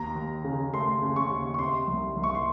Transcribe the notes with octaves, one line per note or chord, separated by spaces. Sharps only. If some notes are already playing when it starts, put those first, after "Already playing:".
Already playing: D#2 A#5
D#2
C#3
A3 C6
C#3
C#6
D#2
C#6
C3 C6
C2
C2
C#6
C6